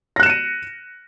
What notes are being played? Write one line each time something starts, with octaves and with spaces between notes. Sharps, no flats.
F#6 A#6 C#7 D#7 E7